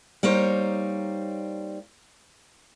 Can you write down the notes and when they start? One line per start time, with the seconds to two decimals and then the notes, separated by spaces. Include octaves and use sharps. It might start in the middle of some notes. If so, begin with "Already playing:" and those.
0.23 G3 A#3 D#4 C5 C#5